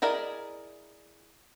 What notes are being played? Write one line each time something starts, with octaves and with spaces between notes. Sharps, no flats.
E4 G#4 A#4 D5 D#5